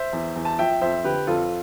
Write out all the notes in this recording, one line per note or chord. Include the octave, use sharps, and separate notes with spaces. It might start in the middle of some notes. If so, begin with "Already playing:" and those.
Already playing: C5 E5
E2
E2
A5
F3 E5 G5
F2 C5 E5
D3 G4 B4
F2 F4 A4